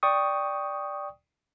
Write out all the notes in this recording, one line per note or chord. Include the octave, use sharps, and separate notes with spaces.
D5 G5 C#6 D#6